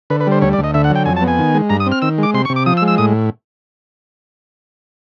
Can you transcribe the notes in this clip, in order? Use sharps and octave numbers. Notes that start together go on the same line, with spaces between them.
D3 B4
B4
G3 C5
D2 C#5
D5
D2
D#5
D3 E5
F#5
F#3
G5
F2 G#5
A5
B3
G#5
D#3
G#3
G2 A#5
D#6
C4
F6
D#3 E6
G#3 D6
C3 C6
C#6
C3
D6
F3 D#6
E6
G#3
E6
A2 D#6